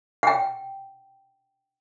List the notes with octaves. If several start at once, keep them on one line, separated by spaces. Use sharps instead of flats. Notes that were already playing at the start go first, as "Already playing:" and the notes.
F#5 G5